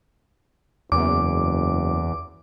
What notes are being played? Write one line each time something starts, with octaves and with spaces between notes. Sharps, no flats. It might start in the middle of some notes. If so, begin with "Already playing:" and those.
F#1 E2 D6